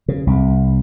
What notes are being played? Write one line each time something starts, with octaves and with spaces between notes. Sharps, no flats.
C#3
C2